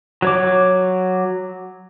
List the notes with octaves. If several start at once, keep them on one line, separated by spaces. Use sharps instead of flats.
F#3 C#5 D6